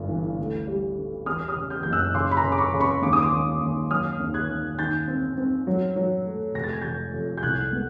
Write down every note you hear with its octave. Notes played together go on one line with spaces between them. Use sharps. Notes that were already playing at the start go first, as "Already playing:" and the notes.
Already playing: G1 G2
E3
D2
G3
D3
E2 D#6 F6
D#6 F6
C#3
F6 G6
F#1 G6
E6 F#6
C#3 C6 D6
B5
A#5 C6
C#3
D6
B5 C#6
C#3
B5 C#6
D#2 D6
D#6
C6 D6
D#2
D#2
F#3 D#6 F6
D#2
F#6 G#6
D#2
D#3 G6 A6
C4
C4
F#3
F#3
A3
F1 A#6
A6
G#6
F1 G6 A6
F2
G6
C2 F#6 G#6
B3